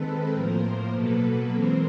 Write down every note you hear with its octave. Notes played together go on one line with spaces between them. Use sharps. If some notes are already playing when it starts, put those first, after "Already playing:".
Already playing: D#3 G#3 C4 A4 B4
A2 F3 A#3 A#4 C5
B2 F#3 A#3 A4 B4
E3 G#3 C4 A#4 C5